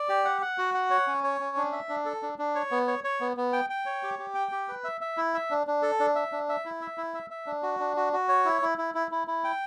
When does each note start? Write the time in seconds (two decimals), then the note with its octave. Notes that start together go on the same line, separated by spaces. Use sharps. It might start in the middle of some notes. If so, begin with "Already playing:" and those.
Already playing: D5
0.09 G4
0.25 F#5
0.42 F#5
0.58 F#4
0.74 F#5
0.90 C#5
1.07 C#4
1.24 C#5
1.40 C#4
1.57 D4
1.72 E5
1.89 D4
2.05 A4
2.23 D4
2.39 D4
2.55 C#5
2.71 B3
2.88 C#5
3.04 C#5
3.20 B3
3.37 B3
3.53 G5
3.70 G5
3.86 C#5
4.03 G4
4.19 G4
4.35 G5
4.52 G4
4.68 B4
4.84 E5
5.01 E5
5.17 E4
5.34 E5
5.51 D4
5.67 D4
5.82 A4
6.00 D4
6.15 E5
6.32 D4
6.49 E5
6.65 E4
6.81 E5
6.98 E4
7.14 E5
7.30 E5
7.46 D4
7.63 F#4
7.80 D4
7.97 F#4
8.13 F#4
8.29 C#5
8.45 E4
8.62 E4
8.78 E4
8.95 E4
9.11 E4
9.28 E4
9.44 G5